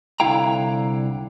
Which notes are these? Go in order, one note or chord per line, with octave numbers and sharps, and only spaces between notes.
C2 D3 E4 F5 G5 A#5